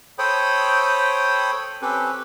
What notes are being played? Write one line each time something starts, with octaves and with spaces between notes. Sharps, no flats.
A4 C5 C#5 G5 B5 D#6
C4 C#4 G4 A4 B4